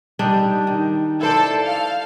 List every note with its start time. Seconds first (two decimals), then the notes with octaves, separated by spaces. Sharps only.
0.19 G3 D4 D#4
0.67 D#3
1.21 E4 A4 C5 D5 A5
1.65 F5